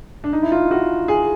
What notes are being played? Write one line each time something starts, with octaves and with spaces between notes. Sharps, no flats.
D4
D#4
E4
F4
F#4
G#4